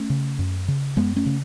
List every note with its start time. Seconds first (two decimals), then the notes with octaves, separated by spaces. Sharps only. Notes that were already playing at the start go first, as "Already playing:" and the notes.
Already playing: A3 C#4
0.10 C#3
0.39 F#2
0.68 C#3
0.97 F#2 G#3 B3
1.16 A3 C#4
1.26 C#3